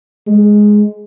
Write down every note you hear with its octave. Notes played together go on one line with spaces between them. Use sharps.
G#3